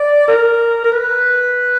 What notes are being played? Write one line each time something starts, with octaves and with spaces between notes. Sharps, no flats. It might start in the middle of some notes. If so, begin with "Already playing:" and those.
Already playing: D5
A#4
A#4
B4